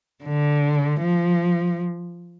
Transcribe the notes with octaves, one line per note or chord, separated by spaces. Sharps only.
D3
F3